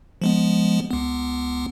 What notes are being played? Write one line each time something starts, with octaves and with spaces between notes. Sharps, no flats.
F3 G#3 B3
C#2 B3